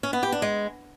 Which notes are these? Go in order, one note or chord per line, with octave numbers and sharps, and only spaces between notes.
C#4
B3
G4
D4
G#3